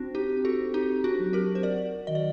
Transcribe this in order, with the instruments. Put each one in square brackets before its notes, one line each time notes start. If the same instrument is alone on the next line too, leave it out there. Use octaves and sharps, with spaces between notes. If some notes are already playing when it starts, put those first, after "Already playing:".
Already playing: [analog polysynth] C4 [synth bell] D4 F#4
[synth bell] D#4 G4
[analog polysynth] C4
[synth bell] F#4 A4
[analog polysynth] C4 [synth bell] D#4 G4
[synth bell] D4 F#4
[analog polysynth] F#3
[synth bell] G4 A#4
C5
[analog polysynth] F#4 [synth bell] A#4 D5
[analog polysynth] D#3 [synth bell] D#5
[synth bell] D5